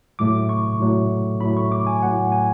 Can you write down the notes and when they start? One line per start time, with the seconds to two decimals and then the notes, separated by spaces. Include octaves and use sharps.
0.19 A2 F#3 A3 D6
0.49 C#6
0.80 A2 F#3 A3
1.41 A2 F#3 A3 B5
1.57 C#6
1.72 D6
1.87 G#5
2.02 A2 F#3 A3 F#5
2.32 G#5